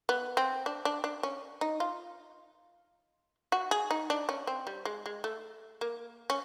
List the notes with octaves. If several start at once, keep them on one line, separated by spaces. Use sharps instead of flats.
B3
C4
D4
D4
D4
C#4
D#4
F4
F#4
G#4
D#4
D4
C#4
C4
G3
G#3
G#3
A3
A#3
C#4